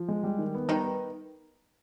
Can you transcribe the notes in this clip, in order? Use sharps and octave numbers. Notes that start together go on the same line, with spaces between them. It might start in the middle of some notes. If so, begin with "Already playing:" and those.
Already playing: F3
G#3
G3
D#3
B3
D#3 G3 D#4
B4